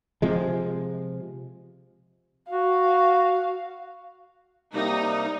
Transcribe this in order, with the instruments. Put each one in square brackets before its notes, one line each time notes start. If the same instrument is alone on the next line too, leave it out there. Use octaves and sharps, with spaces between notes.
[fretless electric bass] C3 F3 G#3
[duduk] F#4 [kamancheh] F5
[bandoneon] C3 G3 A#3 [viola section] D#4